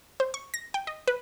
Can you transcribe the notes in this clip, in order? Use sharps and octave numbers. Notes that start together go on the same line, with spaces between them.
C5
C#6
A#6
G5
D#5
B4